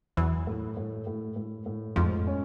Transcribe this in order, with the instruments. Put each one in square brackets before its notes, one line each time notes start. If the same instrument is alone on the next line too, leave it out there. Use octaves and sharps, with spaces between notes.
[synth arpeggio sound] E2 E3 [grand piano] F#3
[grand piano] A2
A2
A2
A2
A2
[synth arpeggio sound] F2 F3 [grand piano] G#2
[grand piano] C#4